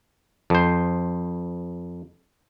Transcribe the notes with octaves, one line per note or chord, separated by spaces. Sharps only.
F2 C5